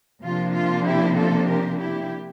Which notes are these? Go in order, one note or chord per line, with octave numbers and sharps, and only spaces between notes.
C3 F3 A#3 D4 F4
F4
E4 G4
F4 A4
G4 A#4
E4 G4